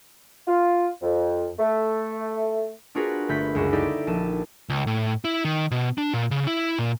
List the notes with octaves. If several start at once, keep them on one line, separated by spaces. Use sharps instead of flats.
F4
F2
A3
D4 F4 F#4 G#4 A#4 B4
G1 A3 B5 G6 B6
C#2 F#2 G#3 F#4 E7
D#4 E4 G4 A4 D5
A#1 A5 D#7 E7
C#2
A2
E4
D#3
B2
D4
A#2
C#3
E4
A#2